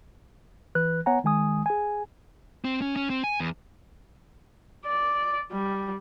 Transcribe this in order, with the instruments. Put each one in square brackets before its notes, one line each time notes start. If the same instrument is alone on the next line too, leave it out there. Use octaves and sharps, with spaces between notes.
[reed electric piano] E3 B4 F#6
B3 C#5 F#5 G#5 A#5
D#3 G#3 G#5 D#6
G#4 G#5
[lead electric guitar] C4
C#4
C#4
C4
G#5
E2
[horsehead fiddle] D5
G3